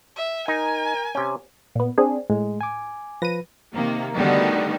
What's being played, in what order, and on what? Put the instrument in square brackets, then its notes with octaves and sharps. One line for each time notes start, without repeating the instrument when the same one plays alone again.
[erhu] E5
[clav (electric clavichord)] D#4 [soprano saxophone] A#4 [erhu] G#5
[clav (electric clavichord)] C3 C#4
[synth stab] A#2 B3
C4 D4 G#4
[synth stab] A2 [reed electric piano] G#3
[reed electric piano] G#5 D6
[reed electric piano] F3 B4 [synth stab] A#6 D#7
[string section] C3 D#3 A#3
D3 D#3 G3 A3 B3 F#4